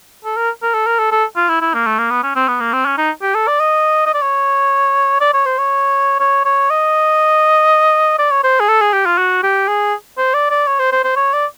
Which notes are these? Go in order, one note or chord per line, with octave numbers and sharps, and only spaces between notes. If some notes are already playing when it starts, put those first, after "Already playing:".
A4
A#4
A#4
A4
A#4
A4
A4
F4
E4
E4
A#3
A3
A#3
B3
C#4
C4
B3
A#3
C4
C#4
D#4
G4
A4
D5
D#5
D#5
D5
C#5
D5
C#5
C5
C#5
C#5
C#5
D#5
D5
C#5
C5
G#4
A4
G#4
G4
F4
F#4
G4
G#4
C5
D5
D5
C#5
C5
C5
C5
C#5
D5